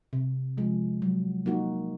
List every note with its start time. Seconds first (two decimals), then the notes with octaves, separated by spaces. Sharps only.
0.13 C3
0.57 F3 G#3
1.02 F#3
1.46 A#3 D#4 F#4